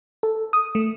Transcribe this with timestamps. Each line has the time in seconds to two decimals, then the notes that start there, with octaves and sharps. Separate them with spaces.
0.23 A4
0.53 D#6
0.75 A3